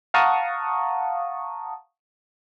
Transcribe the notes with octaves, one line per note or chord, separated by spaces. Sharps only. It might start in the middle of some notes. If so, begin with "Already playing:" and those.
F5 F#5 A5 A#5 C#6 D#6